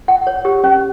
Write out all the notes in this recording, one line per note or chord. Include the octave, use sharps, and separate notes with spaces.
F#5
C#5
G4
C#4